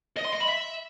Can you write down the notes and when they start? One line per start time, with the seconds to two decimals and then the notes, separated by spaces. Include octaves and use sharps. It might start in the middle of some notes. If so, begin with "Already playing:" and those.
0.17 D#5
0.25 C6
0.32 D#5
0.40 B5
0.48 E5